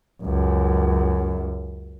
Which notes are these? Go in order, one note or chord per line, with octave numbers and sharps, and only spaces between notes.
C#2 F#2